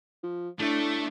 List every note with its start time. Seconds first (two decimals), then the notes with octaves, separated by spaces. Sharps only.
0.23 F3
0.60 A2 A3 D4 A4